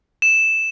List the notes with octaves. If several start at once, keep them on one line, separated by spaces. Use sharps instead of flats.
E7